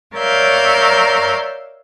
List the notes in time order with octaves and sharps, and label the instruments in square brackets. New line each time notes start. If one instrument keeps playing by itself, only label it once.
[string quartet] A#4 C#5 D5 E5 F5 G6